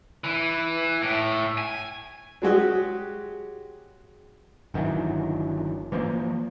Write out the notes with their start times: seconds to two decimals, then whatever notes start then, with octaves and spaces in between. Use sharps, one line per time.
0.24 E3
1.02 A2
1.58 G#5
2.42 F#3 G#3 F#4 G4
4.74 G1 D#3 E3 F#3
5.92 E3 F3 A3 A#3